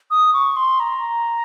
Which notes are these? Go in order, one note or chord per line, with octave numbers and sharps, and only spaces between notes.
D#6
C#6
C6
A#5